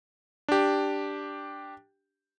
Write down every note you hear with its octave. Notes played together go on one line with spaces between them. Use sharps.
D4 G4